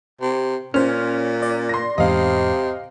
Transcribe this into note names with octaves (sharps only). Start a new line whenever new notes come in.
C3
A#2 C#4 C5 F6
D5
C6 A#6
E2 G#2 C3 D#5 F5